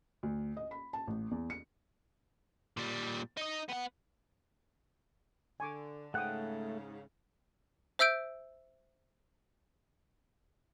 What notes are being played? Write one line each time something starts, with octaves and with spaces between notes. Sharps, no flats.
D2
D#5
B5
A5
A1
E2
C#7
A#2 G3
D#4 D#5
B3 F#5
D3 G#5 C#6 D6
G#2 C#3 A3 F#5 G5 D#6 F#6
C5 E5 E6 G6 D7